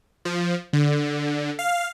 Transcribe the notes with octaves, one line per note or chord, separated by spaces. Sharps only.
F3
D3
F5